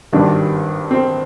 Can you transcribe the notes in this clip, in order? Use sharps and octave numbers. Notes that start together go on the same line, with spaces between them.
G#1 G2 D#3 G3 D4
C4